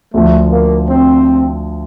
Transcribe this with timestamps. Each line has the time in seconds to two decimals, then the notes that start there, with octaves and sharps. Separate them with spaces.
0.13 D2 D3 F3 A3
0.51 A#3
0.89 C4